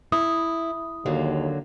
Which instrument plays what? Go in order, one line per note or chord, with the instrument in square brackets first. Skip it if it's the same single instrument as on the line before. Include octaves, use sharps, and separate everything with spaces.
[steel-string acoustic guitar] E4 [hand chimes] D#6
[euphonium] D#2 [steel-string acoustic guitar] D3 F#3 A#3